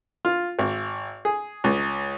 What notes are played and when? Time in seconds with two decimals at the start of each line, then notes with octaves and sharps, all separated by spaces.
0.25 F4
0.59 G#1
1.25 G#4
1.64 C#2